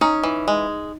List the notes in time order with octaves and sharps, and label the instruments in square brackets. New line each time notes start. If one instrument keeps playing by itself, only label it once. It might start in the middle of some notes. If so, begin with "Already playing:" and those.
[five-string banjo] C#4 [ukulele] D#4
[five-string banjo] E3
G#3